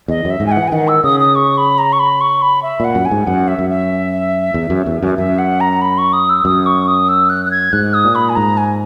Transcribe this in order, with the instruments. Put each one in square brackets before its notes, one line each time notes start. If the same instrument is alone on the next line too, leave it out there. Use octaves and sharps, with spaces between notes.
[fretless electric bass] E2 [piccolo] D#5
[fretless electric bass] F#2
[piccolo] E5
[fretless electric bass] G#2
[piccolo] G#5
F#5
[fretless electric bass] E3
[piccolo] G#5
[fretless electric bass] D#3 [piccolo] F#5
[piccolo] E6
[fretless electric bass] C#3 [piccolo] D#6
[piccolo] D#6
C#6
B5
A#5
C#6
B5
C#6
B5
E5
[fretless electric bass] A#2 [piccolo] F#5
[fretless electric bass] F#2
[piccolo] G#5
[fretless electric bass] G#2
[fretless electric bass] F#2 [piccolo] F#5
[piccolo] E5
[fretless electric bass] F#2
[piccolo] E5
[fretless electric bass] E2
F#2
E2
F#2
[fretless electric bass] F#2 [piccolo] E5
[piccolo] F#5
A#5
B5
C#6
D#6
E6
[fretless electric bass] F#2 [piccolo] D#6
[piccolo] C#6
D#6
E6
F#6
F#6
G#6
[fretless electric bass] G#2 [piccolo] F#6
[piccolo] D#6
[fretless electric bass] A#2
[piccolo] B5
G#5
[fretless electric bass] G#2 [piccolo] A#5
[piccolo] G#5